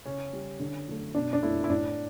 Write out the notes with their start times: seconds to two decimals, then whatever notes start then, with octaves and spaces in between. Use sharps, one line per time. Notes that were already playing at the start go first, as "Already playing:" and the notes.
0.06 C#3 C#4
0.33 G3
0.60 D3
0.88 F#3 A3
1.15 B2 D4
1.33 D4
1.43 A3 E4
1.64 E4
1.70 A2 D4